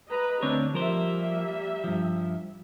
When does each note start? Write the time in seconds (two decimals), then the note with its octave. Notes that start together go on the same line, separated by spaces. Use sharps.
0.10 B4 D#5 A#5
0.42 D2 C4 D4 C#5
0.74 F3 G3 A#3 A#4 C5 E5
1.84 G2 F3